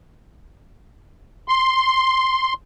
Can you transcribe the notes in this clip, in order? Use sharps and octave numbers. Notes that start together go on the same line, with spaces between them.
C6